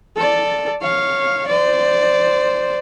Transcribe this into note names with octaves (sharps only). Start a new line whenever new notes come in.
A4 D5
C#5 F5
C5 D5